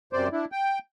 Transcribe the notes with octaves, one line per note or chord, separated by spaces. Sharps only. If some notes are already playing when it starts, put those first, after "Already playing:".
F#2 C3 C5 D5
D4 E4
G5